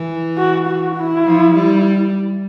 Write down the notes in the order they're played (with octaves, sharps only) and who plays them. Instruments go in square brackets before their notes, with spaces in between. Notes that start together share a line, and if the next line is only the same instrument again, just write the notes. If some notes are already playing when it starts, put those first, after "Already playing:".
Already playing: [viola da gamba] E3
[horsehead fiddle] F#4
F#4
E4
[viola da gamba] F3
G3